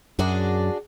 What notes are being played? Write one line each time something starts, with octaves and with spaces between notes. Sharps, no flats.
F#2 D4 F#4 G#4